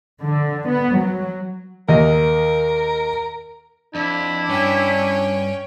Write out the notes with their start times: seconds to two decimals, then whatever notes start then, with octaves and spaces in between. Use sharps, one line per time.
0.21 D3
0.68 B3
0.98 F#3
1.89 D#2 A#4 D#5
3.95 F2 D4 E4
4.49 G2 C#4 G5